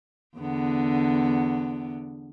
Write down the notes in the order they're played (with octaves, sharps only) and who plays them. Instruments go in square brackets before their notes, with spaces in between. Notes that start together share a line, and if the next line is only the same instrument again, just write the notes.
[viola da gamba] E2 D3 B3